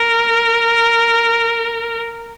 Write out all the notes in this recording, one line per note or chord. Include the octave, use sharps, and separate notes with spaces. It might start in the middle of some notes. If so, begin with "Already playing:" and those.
Already playing: A#4